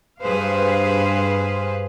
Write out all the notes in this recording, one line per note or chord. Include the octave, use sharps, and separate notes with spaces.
G2 G#4 B4 C5 F5